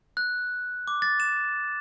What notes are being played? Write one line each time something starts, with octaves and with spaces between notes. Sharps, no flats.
F#6
D6
A6
E7